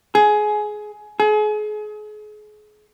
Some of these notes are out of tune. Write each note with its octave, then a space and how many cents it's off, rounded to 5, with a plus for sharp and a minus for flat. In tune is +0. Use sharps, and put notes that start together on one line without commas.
G#4 +20
G#4 +35